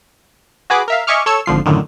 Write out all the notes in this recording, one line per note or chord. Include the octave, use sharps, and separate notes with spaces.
F#4 G#4 B4 D6
A#4 E5 F5
D#5 E5 G#5 C#6 D6 F6
A4 C#5 E6 C#7
G#1 D3 F3 C7
F#2 A2 D3 D#3